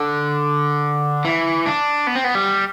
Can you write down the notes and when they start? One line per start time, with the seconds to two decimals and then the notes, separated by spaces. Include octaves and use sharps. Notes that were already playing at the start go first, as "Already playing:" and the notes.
Already playing: D3
1.25 E3
1.66 D4
2.07 B3
2.16 C4
2.24 B3
2.35 G3